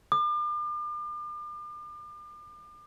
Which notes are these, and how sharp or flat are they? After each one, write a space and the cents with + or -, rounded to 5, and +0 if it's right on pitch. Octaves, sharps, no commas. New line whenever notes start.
D6 +40